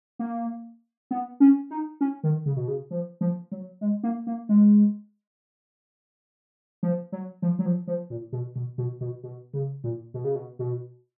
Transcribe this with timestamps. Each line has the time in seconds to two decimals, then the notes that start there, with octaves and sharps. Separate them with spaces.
0.19 A#3
1.11 B3
1.40 C#4
1.71 D#4
2.01 C#4
2.24 D#3
2.46 C#3
2.57 B2
2.68 C#3
2.91 F3
3.21 F3
3.52 F#3
3.81 G#3
4.03 A#3
4.27 A#3
4.49 G#3
6.83 F3
7.12 F#3
7.42 F3
7.59 F#3
7.66 F3
7.87 F3
8.10 A#2
8.33 B2
8.56 B2
8.78 B2
9.01 B2
9.23 B2
9.54 C#3
9.84 A#2
10.14 B2
10.24 C#3
10.35 B2
10.59 B2